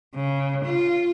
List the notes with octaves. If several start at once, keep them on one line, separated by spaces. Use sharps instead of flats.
C#3
F4